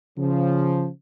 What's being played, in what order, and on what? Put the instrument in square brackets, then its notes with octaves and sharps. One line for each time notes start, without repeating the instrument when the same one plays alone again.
[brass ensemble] C#3 F3